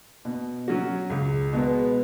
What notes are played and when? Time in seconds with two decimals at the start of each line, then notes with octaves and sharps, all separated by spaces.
0.25 B2
0.68 F#3 C#4 F#4
1.10 C#2
1.53 B2 G#3 B3